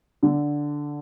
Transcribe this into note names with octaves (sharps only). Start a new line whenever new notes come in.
D3